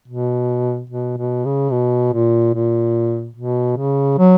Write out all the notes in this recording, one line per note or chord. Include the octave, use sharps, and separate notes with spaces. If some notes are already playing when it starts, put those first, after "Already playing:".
B2
B2
B2
C#3
B2
A#2
A#2
B2
C#3
F#3